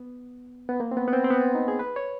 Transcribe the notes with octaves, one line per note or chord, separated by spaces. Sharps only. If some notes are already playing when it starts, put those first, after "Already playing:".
Already playing: B3
B3
A#3
C4
B3
B3
C4
C4
B3
D#4
G#4
B4
C#5